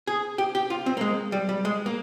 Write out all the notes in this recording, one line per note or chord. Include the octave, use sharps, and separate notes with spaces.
G#4
G4
G4
F4
C4
A#3
G#3
G3
G3
G#3
A#3